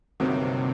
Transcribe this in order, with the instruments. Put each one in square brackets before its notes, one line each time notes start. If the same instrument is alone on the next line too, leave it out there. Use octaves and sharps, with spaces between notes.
[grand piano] G1 G2 D#3 F#3 A#3 [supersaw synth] C3